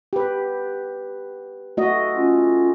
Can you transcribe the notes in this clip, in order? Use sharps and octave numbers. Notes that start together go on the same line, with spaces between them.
G4 B4
A3 F#4 D#5
C#4 F4